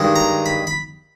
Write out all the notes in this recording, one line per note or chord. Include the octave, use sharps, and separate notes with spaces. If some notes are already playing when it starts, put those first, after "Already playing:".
Already playing: G2 D#3 G#3
A#5
B5
B5